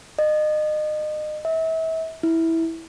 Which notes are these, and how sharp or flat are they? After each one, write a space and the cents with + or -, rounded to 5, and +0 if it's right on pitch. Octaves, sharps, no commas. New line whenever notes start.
D#5 -30
E5 -35
E4 -10